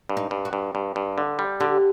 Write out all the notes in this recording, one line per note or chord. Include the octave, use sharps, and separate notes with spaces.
G2
D#4
G2
F#4
G2
G2
G2
D3
G3
D3 G4